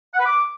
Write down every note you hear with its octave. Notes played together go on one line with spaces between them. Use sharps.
F#5
B4
D6